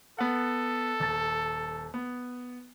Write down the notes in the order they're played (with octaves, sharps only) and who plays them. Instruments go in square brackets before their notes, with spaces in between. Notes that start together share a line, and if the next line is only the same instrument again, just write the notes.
[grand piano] B3 F#5 [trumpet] A4
[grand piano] D#1 A6
B3